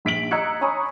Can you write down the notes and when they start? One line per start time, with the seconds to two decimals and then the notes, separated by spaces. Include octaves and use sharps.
0.05 A#1 B6 D7 F#7
0.31 D#5 A#5 E6 F#6 G#6 C#7
0.61 C#5 G#5 A#5 B5 C#6 D#6